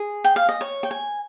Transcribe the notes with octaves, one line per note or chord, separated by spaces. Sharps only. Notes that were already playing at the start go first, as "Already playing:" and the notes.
Already playing: G#4
G5
F5
D#5
C#5
G5
G#5